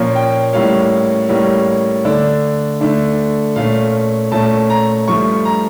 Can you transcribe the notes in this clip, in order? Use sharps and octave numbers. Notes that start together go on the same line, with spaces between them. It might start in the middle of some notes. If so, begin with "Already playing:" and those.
Already playing: A#2 F3 A#3 C#4
G5
A2 G3 A#3 C#4 F5
A2 G3 A#3 C#4
D3 A3 D4
D3 A3 D4
A#2 A3 C#4 F5
A#2 A3 C#4 A5
A#5
G2 F3 A3 C#6
A#5